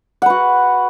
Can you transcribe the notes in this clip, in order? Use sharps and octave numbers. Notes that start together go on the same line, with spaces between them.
F#4 B4 F#5